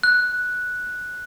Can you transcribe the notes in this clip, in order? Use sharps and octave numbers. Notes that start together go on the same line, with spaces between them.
F#6